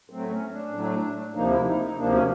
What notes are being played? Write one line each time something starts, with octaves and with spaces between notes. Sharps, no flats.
A2 F#3 A3 C4
C#4
D4
A2 F#3 A3
D2 C3 F3 A#3 D#4
E4
D#4
D#4
D2 C3 F3 A#3 D4
C#4